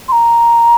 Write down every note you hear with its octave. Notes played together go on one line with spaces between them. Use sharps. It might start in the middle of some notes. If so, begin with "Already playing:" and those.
C6
A#5